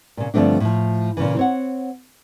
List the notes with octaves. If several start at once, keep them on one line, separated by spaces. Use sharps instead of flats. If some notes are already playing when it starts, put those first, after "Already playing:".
A#2 C#3
G2 D3 F3 A3 C4 D4
A2 F3
A#2 C#3 E3
C4 C#5 F#5